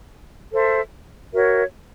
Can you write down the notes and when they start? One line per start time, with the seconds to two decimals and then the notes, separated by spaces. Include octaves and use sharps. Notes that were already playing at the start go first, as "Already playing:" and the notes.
0.51 A4 C5 E5
1.34 F#4 A#4 C#5 E5